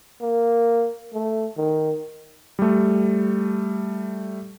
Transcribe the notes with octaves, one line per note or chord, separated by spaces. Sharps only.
A#3
A3
D#3
G3 A3